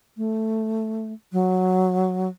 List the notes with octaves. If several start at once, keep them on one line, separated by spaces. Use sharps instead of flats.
A3
F#3